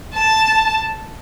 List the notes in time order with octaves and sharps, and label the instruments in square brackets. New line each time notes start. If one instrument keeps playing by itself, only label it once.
[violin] A5